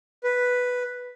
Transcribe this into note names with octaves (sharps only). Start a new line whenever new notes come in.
B4